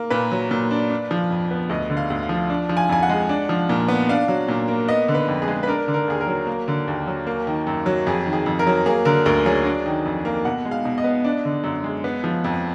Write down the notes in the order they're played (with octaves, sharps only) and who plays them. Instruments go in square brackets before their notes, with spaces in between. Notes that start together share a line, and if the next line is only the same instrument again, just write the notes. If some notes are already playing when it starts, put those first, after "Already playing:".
Already playing: [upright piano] A#3
A#2 B4
F#3
A#2
D4
D4
F3
F2
B3
D2 D#5
D3
F5
D2
F5
F3
D4
F3
G#5
F2 G#5
F#5
G#3
D4
F3
A#2
B3
D4 F5
F#3
A#2
A#3
B3 D#5
D3
B4
F2
G#4
G#3
B4
D4 A#4
D3
A#4
D#2 G#4
A#4
F#3
A#3
D3
D#2
F#3
A#3
D#3
F#2
F#3
F2 G#4
D#3
G#4
F2
A#4
F#3
A#3 G#4
D3 A#4
D2 A#4
F#3 G#4
D4
D#3
F2
A#3
B2 F#5
G#3
F5
B2
D#5
B3
D4
D3
F#2
G#3
B3
F3
F2